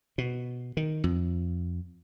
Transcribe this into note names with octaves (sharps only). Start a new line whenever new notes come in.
B2
D#3
F2